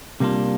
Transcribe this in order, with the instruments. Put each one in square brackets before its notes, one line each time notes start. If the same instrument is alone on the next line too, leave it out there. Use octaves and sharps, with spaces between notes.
[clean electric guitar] C3 G3 A#3 D4 F4